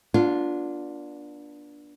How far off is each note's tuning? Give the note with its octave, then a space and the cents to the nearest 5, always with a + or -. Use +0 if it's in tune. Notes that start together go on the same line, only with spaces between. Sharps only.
B3 -40 D4 +0 F4 +0